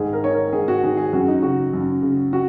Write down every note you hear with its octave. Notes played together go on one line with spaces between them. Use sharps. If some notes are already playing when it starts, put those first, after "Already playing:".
Already playing: G#2 D#3 G#4
A#4
D#3 C#5
A#4
G#2 G#4
F#4
D#3 G#4
G#4
F#2 F#4
D#4
C#3 F#4
F#2
C#3
F#4